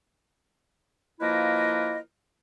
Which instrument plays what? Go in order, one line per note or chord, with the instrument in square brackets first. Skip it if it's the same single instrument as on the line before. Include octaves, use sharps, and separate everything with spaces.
[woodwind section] F3 A#3 E4 A#4 B4 D#5